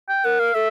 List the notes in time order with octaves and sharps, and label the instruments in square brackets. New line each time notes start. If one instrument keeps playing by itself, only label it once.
[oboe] G5
[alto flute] A#4 [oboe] F#5
[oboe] F5
[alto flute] A4 [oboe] E5